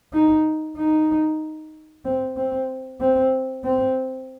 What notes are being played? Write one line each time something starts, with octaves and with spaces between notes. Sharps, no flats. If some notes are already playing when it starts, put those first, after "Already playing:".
D#4
D#4
C4
C4
C4
C4